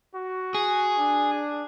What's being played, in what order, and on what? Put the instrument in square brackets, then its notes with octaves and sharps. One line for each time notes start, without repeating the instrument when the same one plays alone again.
[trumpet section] F#4
[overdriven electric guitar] G#4
[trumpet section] D4